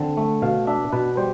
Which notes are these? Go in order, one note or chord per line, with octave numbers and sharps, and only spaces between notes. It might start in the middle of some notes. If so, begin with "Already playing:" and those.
Already playing: D3 C4
A3
B2 F5
D4 E5
B2 B4
G3 C5